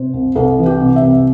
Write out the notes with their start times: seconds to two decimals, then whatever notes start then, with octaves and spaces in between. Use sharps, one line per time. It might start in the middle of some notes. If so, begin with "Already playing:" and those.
Already playing: C3 C5
0.14 C2
0.35 C2 A4
0.59 E3
0.66 G4
0.81 C3
0.96 E5
1.03 C2